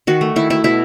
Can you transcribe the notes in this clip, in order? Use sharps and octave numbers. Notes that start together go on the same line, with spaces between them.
D#3 F#4
A3
D#3 E4
A3 E4
B2 E4